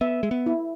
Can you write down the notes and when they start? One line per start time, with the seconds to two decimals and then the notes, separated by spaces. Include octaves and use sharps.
0.01 B3 E5
0.23 G#3
0.31 B3
0.46 E4